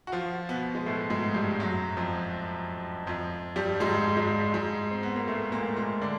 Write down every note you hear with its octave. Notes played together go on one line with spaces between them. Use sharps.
F#4
F3 F4
B2 B3
G#3
A2 A3
G#2 G#3
G2 G3
F#2 F#3
F2 F3
F2 F3
G2 G3
G#2 G#3
G#2 G#3
G#2 G#3
C4
B3
A#3
A2 A3
A#2 A#3
A#2 A#3
D3 D4